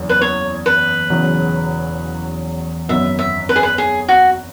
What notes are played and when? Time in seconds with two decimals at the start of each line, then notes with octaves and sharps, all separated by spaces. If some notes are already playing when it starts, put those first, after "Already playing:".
Already playing: F#1 E2 C#3
0.09 B4
0.21 C#5
0.66 B4
1.10 E1 E2 C#3 F#3
2.89 G#1 F#2 F#3 B3 E5
3.19 E5
3.49 B4
3.56 G#4
3.63 B4
3.78 G#4
4.08 F#4